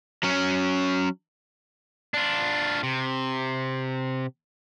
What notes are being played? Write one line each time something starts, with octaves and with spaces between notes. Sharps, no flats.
F#3 C#4
D4 F4
C3